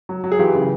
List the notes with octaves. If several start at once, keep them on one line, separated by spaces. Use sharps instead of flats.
F#3
F#3
G#4
E3 F4 G4
C#3